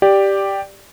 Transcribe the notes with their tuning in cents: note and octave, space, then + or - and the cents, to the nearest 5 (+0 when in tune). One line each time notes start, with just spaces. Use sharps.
G4 +0 D5 +0